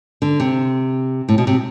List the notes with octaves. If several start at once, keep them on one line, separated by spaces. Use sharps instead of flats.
D3
C3
A2
B2
C3